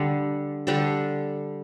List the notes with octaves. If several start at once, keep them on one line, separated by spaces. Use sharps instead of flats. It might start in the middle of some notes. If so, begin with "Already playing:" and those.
Already playing: D3 G3 D4 A4
D3 G3 D4 A4